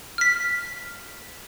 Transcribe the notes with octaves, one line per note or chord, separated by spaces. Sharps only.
F6 B6